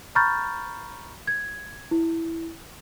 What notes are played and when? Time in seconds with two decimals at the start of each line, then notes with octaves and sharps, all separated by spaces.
0.15 A#5 B5 C#6 F6 G6 A6
1.27 G#6
1.91 E4